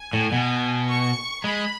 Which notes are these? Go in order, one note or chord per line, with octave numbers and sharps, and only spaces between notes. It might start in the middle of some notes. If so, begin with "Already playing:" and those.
Already playing: G#5
A2
B2
C#6
G#3 B5